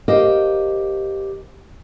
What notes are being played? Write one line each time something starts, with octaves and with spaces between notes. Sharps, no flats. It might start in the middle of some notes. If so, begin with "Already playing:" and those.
G4 A#4 C5 D#5 F5 G5